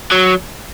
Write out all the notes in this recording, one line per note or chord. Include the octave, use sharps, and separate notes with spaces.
F#3